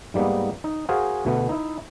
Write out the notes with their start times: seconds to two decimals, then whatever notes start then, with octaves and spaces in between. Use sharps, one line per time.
0.14 G#2 G3 A#3 B3 D#4
0.64 D#4
0.89 F#4 G#4 A#4 C5 F5 G#5
1.25 D2 B2 A3 B3
1.49 D#4 E4